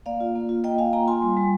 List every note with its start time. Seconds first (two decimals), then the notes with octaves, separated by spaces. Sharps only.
0.06 A#3 D5 F5
0.20 F4
0.35 A#3
0.49 F4
0.64 A#3 D#5 G5
0.78 F4 F5 G#5
0.93 A#3 G5 A#5
1.08 F4 G#5 C6
1.22 G3
1.37 G3